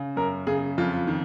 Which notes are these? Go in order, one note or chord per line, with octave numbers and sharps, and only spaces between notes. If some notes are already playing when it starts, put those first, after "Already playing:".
Already playing: C#3
F#2 A#4
C#3 G#4
F2 F4
D#3